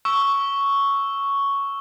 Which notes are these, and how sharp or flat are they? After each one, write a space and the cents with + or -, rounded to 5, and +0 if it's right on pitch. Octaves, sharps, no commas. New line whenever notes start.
C#6 +5 E6 +0